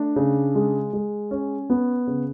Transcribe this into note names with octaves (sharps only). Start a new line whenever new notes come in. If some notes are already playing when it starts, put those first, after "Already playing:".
Already playing: A3 D4
C#3
G#3
G#3
C#4
B3
C#3